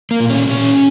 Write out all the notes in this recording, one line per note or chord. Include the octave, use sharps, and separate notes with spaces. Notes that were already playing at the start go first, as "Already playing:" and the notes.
A#3
A#2
C#4
A#2 C#4